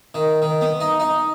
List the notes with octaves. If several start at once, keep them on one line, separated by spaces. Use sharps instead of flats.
D#3
D#3
B3
D#4
D#4